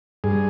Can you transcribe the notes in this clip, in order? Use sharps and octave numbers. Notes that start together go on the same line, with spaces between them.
G2 G#4